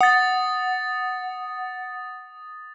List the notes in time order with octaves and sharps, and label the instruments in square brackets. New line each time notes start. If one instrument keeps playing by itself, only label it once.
[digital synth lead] F#5 [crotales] D#6 A6